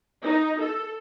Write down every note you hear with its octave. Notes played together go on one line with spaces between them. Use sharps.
D#4
A4